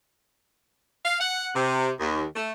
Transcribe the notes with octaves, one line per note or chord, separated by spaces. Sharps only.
F5
F#5
C3
D#2
A3